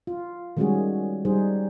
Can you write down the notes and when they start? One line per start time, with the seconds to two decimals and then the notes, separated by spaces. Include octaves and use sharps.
0.07 F4
0.57 D#3 G3 G#3 C#4 F#4 G#4
1.25 G3 D#4 G#4 C5